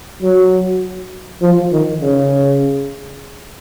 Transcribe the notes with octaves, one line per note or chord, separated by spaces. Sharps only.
F#3
F3
D#3
C#3